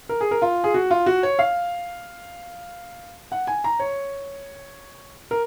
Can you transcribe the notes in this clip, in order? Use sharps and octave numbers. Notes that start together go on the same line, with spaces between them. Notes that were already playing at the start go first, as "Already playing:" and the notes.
A#4
G#4
A#4
F4
G#4
F#4
F4
F#4
C#5
F5
F#5
G#5
A#5
C#5
A#4